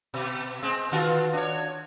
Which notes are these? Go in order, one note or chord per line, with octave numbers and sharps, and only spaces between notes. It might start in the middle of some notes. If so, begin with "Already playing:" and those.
B2
G#3 C4
D#3 F4 F#4
D4 C#5